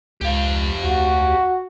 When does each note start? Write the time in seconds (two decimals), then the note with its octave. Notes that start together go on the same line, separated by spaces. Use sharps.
0.21 C#2 G4 F5
0.84 D2 F#4